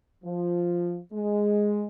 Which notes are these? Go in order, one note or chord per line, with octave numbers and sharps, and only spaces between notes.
F3
G#3